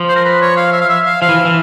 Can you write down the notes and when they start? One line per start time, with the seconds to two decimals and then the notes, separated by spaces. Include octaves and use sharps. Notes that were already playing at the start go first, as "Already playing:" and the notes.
Already playing: F3
0.09 C5
0.16 A#4
0.25 B4
0.41 C#5
0.57 F5
0.73 E5
0.81 F5
0.89 E5
1.06 F5
1.22 F3 F5
1.29 E3
1.45 E3